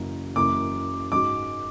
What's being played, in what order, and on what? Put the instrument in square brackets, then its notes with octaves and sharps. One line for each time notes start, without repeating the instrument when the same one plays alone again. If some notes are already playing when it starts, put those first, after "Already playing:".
Already playing: [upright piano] F#1 F#2 C#3 E3
[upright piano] F#1 F#2 E3 [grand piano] D6
[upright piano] G#2 G#3 C#4 F#4 [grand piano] D6